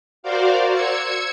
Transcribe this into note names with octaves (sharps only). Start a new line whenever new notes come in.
F#4 A#4 C5 D5 F5
E6 G#6 C#7